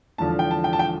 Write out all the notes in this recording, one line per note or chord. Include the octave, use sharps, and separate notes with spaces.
E1 E2 D3 F3 A5
G5
A5
G5
A5
G5